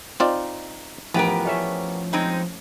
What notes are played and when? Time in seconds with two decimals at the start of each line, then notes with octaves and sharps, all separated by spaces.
0.20 C4 D#4 F4 D5
1.14 A1 E3 F3 B3 G4 A#4
1.45 A3 C#4 E5
2.13 G#3 C4 D#4